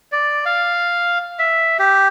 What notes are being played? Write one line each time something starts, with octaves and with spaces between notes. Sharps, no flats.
D5
F5
E5
G4